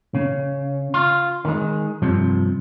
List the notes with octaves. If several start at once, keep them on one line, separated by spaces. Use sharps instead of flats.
C#3
F4
D#3 G#3
C2 G2 C3 F3